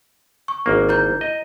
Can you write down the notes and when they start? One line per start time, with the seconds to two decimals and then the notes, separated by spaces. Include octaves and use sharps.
0.48 C#6
0.66 G#1 A#3
0.89 E4 A#5 G6
1.21 D#5